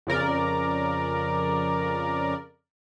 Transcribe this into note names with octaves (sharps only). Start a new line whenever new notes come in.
F2 C#3 A#4 D5